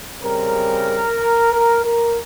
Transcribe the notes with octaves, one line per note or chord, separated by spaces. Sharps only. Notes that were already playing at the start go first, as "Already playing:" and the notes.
C#3 G3 C4 A#4
A#4
A#4